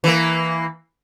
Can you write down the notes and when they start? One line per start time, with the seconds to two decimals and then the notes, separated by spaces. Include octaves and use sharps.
0.04 E3 A#3